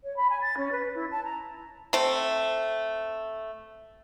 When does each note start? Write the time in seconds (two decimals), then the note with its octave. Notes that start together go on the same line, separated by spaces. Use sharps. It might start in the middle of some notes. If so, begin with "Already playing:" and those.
0.03 C#5
0.16 B5
0.29 G#5
0.41 A6
0.57 C#4
0.71 B4
0.94 E4
1.10 A5
1.24 A#5
1.93 A3 C4